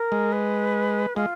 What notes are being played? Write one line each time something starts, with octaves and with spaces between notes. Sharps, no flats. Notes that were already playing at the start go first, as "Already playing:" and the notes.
Already playing: A#4
G#3
B4
G#3 F4